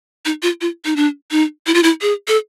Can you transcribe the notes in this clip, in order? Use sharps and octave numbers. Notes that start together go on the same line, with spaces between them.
D#4
F4
F4
D#4
D4
D#4
E4
F4
E4
G#4
A4